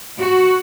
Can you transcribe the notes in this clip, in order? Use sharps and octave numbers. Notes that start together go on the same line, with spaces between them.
F#4